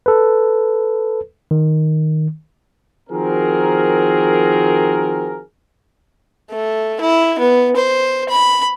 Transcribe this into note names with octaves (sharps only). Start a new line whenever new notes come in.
A4 B4
D#3
D#3 F3 C4 F#4 G#4 A#4
A3
E4
B3
C5
B5